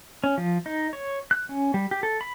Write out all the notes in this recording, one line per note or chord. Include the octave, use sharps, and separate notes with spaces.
C#4
F3
D#4
C#5
F#6
C#4
G3
G4
A4
B5